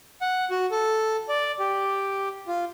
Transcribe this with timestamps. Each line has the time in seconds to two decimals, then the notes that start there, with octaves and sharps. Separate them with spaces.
0.21 F#5
0.51 F#4
0.71 A4
1.29 D5
1.59 G4
2.47 F4